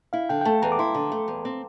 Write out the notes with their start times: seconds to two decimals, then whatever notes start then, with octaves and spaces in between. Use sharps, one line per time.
0.13 E4 F5
0.29 D3 G5
0.41 G5
0.45 A3 A5
0.62 E2 A#5
0.72 D6
0.79 E4 C6
0.95 D3
1.12 A3
1.28 E2
1.45 C4